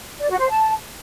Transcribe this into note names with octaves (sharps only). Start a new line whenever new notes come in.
D5
F#4
C5
A5